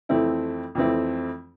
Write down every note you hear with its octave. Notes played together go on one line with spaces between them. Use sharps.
F2 E3 A3 C4 E4
F2 E3 A3 C4 E4